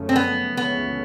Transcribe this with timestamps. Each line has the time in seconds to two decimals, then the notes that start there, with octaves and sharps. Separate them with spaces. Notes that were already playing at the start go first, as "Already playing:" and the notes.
Already playing: F#2 C#3 F3 A3 C#4
0.09 C4
0.16 B3
0.57 C#2 C#3 E3 A3 B3 C#4